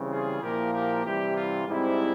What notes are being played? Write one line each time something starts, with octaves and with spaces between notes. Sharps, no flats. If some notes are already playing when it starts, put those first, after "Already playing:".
Already playing: C#3 E3 G3 C4
F4 G#4
A#2 F3 A#3 E4 G4 A#4
G4 A#4
C3 E3 G3 E4 G4
F4
G#2 G3 C4 E4